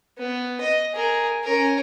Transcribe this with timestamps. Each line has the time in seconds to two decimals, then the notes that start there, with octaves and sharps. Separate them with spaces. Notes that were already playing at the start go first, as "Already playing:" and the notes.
0.18 B3
0.61 D#5
0.95 G#4 A#4
1.44 C#4 A#4